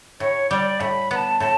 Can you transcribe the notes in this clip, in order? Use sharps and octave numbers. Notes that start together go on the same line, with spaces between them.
A2 C#5
G3 D5
A2 B5
B3 A5 B5
A2 A5